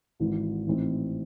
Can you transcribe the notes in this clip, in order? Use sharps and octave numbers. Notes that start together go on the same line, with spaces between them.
G#1 G#2 E3
A1 A2 E3 C4 D#4